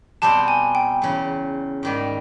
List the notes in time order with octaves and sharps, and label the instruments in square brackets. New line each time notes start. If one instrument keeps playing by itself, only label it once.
[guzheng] B2 G3 C4 [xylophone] A5
[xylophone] G#5
G5
[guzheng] E2 C#3 F#3
G#2 D#3 G3